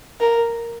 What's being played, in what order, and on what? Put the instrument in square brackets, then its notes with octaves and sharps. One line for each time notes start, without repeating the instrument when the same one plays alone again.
[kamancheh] A#4